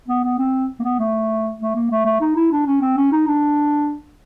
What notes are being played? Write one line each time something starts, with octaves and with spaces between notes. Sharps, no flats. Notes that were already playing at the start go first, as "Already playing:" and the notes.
B3
B3
C4
A#3
B3
A3
A3
A#3
A3
A3
D#4
E4
D4
C#4
C4
C#4
D#4
D4